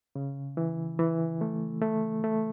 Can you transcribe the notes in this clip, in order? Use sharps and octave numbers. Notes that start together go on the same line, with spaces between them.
C#3
E3
E3
A3
A3
A3